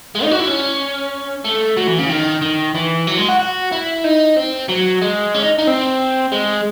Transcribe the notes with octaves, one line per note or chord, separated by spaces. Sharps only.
G#3
D#4
F#4
E4
C#4
A3
F#3
E3
C#3
D#3
D#3
E3
F#3
G#3
F#4
F#4
E4
D#4
C4
F#3
G#3
C#4
D#4
D#4
C4
G#3